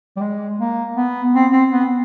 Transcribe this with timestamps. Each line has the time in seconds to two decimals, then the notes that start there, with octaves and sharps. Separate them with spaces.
0.17 G3
0.21 G#3
0.59 A#3
0.96 B3
1.34 C4
1.52 C4
1.72 B3